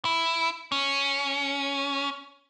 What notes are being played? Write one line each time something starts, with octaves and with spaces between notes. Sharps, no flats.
E4
C#4